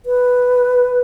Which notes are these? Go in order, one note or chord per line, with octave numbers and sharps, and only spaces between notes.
B4